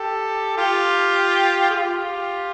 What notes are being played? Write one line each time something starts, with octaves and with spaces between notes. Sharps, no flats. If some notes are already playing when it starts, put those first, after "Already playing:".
Already playing: G4 A4
F4 G4
G#4
F4 G4